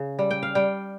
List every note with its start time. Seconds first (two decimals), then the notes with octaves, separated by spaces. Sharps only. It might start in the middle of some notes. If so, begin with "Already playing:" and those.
Already playing: C#3
0.19 G3
0.31 G5
0.43 F5
0.55 G3 G5